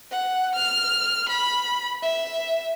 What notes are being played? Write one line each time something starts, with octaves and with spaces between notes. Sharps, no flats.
F#5
F6
B5
E5